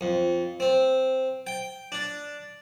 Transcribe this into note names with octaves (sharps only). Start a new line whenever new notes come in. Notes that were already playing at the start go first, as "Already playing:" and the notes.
F2
C4
G5
D4